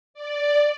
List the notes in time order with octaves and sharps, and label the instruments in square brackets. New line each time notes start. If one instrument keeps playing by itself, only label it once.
[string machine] D5